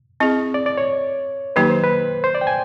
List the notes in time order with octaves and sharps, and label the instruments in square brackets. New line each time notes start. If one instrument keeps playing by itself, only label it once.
[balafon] C4 E4 G#4 [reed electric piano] D#5
[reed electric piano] D5
D5
C#5
[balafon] D#3 F#3 A#3 D#4 G4 [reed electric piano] B4
[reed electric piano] C5
B4
C5
D5
G5
G#5